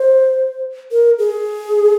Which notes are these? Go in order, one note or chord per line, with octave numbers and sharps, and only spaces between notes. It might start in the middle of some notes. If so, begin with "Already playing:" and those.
Already playing: C5
A#4
G#4